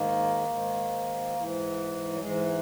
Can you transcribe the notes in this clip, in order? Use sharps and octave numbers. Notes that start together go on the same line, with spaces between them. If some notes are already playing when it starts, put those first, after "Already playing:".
Already playing: G#2 D#3 A#3
G#2 D#3
G#2 E3
F#3
G#2 E3 G#3